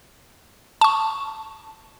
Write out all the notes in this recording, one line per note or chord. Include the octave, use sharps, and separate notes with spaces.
A5 C#6